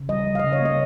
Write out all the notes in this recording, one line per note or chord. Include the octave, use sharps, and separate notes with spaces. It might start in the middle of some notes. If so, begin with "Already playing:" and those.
Already playing: C#3
G3 D#5
G3
F5
C#3 D#5
C#5
A#3 D#5